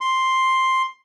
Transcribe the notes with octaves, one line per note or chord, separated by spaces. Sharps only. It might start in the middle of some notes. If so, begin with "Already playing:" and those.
C6